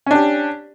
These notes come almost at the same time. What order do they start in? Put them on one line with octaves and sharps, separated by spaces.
C#4 D4 G4